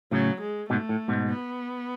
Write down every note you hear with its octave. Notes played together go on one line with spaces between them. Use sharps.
A2 C#3 F#3
G#3
G#2 B2 A3
A2
G#2 B2
B3